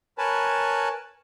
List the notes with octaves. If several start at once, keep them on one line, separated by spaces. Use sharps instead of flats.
A#4 B4 C#5 G#5 A5 B5